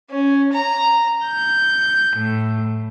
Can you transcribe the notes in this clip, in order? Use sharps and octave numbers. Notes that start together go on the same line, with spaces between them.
C#4
A#5
G6
A2